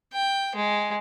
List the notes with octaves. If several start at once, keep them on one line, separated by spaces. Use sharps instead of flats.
G5
G#3